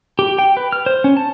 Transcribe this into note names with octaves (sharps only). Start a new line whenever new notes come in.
G4
G5
B4
F6
C5
C#4
A5